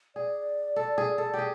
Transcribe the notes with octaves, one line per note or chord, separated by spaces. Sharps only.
G#4 D5
A4
G#4
A4
G4 G#4